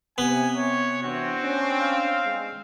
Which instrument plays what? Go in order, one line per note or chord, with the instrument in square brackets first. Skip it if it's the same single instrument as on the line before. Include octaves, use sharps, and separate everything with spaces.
[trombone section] C3 [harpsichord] B3 [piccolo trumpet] G#5
[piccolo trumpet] C#5
[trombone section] E3 D4 [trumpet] C4 [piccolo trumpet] F#4
[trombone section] C#4 D4
[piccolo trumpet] F5
[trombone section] G#3